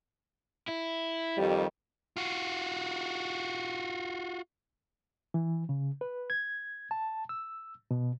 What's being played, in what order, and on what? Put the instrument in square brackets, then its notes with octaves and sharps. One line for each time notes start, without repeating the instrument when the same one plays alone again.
[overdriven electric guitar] E4
[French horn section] F2 D#3 G3
[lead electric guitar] F4 F#4
[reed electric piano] E3
C#3
B4
G#6
A5
E6
B2